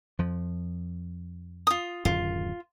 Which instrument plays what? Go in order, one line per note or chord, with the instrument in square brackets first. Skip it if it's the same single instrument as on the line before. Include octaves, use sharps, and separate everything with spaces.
[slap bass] F2 F3
[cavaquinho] F4 D#6
[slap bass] D1 F#2 D#3 [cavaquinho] F4